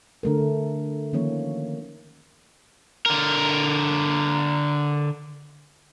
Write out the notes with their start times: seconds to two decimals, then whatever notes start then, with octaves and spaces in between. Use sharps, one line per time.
0.23 D3 A3 A#4
1.13 D#3 F3 A#3 C#4 C#5
3.06 D3 A#4